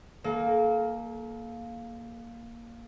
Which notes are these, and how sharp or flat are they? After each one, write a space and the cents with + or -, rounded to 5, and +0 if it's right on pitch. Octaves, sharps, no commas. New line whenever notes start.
A#3 +0 A4 -40